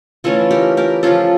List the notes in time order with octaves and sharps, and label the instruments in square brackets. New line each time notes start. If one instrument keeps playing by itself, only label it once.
[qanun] E3 A3 C#4 F4 A4
G4 A#4
G4 A#4
F3 C#4 F4 A4